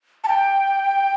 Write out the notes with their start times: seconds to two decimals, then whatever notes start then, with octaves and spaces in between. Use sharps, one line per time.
0.24 A5
0.28 G5